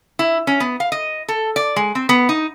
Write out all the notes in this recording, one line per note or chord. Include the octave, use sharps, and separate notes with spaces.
E4
C#4
B3
F5
D#5
A4
D5
G#3
C4
B3
D#4